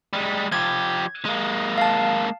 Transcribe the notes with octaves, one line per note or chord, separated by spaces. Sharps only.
G3 G#3
F3 G4 G#6
G#3 A#3
F5 A5